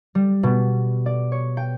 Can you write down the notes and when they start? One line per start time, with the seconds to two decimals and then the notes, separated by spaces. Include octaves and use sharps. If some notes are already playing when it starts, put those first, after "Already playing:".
0.15 G3
0.43 B2
1.06 D5
1.32 C#5
1.57 G5